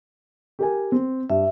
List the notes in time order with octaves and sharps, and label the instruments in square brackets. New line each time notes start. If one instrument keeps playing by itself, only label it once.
[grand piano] G4 A#4 G#5
C4
[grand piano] G2 [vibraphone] E5